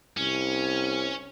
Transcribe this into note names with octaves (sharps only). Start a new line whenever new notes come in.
C2 C#4